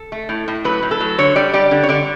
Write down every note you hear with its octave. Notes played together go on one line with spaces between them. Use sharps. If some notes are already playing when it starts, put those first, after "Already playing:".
Already playing: A4
A3
A2
A2
F#3 B4
A2
A4
F#3
D3 C#5
G3 D5
G3 D5
D3
C#5
D3 D5